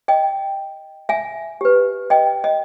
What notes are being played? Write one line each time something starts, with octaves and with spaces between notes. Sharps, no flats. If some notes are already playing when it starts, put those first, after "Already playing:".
D#5 G5
E5 G#5
G4 B4
D#5 G5
D#5